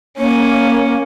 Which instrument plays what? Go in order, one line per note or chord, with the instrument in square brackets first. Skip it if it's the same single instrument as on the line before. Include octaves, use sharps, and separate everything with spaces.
[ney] A#3 [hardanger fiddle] C#4